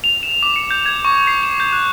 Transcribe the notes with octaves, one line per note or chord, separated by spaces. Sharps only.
F7
E7
D6
C#7
G6
G#6
C#6
C7
E7
G6
F#6